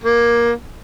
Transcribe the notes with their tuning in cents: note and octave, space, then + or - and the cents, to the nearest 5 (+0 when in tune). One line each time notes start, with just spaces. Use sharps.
A#3 +15